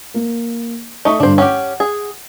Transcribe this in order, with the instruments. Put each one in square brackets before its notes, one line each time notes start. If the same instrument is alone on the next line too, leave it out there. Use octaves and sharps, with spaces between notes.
[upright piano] A#3
[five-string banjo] A3 D#4 [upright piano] C#6
[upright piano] G2 D3 [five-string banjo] D4 C5
[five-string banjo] C#4 G4 [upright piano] F#5
[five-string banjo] G#4